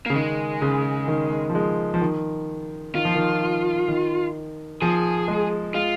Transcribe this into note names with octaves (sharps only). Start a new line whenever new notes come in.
A#3
C#3
D#3 G#3
C#3
D#3
F3
G#3
F3
D#3
D#3 F4
F3
D#3
D#3
F3 G#4
G#3
G#3 F4